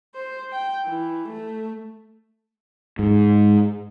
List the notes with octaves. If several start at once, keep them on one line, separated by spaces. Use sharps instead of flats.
C5
G5
E3
A3
G#2